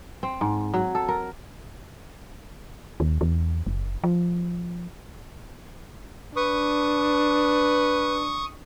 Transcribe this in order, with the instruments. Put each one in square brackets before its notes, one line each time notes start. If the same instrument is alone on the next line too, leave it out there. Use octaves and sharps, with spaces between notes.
[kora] C4
G#2
F#3
A4
A#4
[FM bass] D#2
E2
F#1
F3
[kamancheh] D4 [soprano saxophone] B4 [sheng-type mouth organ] C#6 D#6